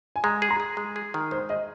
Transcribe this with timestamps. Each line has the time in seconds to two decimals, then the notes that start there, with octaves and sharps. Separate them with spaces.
0.16 G#5
0.24 G#3 A#5
0.42 G#4
0.51 A#5
0.60 G#4
0.77 G#3
0.96 G#4
1.14 D#3
1.31 G#3 C5
1.49 G#4 D#5